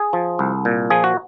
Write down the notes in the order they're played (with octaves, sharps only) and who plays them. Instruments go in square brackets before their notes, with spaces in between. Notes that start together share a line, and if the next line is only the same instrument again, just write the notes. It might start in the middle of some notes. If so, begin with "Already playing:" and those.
Already playing: [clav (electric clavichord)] G#4
F3
C2
A#2
F3 G#4
F#4